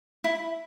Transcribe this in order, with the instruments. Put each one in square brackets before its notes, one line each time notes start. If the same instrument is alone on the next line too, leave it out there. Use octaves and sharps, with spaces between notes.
[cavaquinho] E4